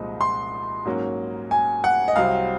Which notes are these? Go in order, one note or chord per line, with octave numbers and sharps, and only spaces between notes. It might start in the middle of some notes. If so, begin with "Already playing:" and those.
Already playing: C2 A#2 F3 G#3 D#4
C6
G#2 F#3 A#3 C#4
G#5
F#5
D#5
C2 C3 F#3 C4 F5